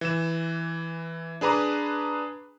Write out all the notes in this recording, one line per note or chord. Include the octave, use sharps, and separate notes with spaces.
E3 E7
D4 G#4 B4 A#5 D6